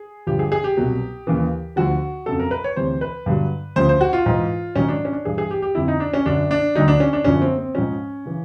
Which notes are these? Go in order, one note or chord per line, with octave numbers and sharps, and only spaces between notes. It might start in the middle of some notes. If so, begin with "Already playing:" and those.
Already playing: G#4
G2 D3 F3 G4
G#4
G#4
G4
C2 B2 F#3
D#2 C#3 E3
D2 D3 F3 F#4
F2 C#3 F#3 A4
A#4
B4
C#5
D2 C3 E3 C5
B4
G2 D3 F#3
D2 C#3 F3 C5
C5
F#4
F4
G#2 E3
G#2 D#3 F#3 C#4
D4
C#4
D4
G2 E3 G#4
G#4
G4
G4
F2 D3 F3 E4
D#4
D4
C#4
F#2 D3 F#3 D4
D4
D2 D3 F#3 D#4
D4
C#4
D4
F#2 D3 F3 C#4
C4
C4
G#2 F3 C#4
C#3 E3